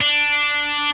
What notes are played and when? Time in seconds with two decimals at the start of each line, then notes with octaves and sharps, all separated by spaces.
0.01 D4